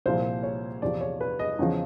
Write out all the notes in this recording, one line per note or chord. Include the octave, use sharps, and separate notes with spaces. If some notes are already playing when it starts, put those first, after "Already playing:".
C2 A#2 F3 C5
C#5
E2 C3 F3 D5
C#5
B4
D#5
E2 C#3 F3